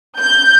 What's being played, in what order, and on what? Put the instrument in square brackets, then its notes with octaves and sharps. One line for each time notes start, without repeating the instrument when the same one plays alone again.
[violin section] G6